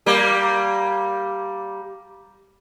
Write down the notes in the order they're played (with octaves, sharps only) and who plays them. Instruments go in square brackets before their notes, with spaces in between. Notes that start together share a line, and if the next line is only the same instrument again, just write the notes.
[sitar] G3 A#3